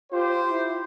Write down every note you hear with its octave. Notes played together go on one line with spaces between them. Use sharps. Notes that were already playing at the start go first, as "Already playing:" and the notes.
F4 G4 C5
E4